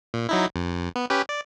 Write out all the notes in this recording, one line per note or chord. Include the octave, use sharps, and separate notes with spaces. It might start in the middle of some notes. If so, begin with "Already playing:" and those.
A#2
F#3 D#4 E4
F2
B3
C#4 G4 B4
D5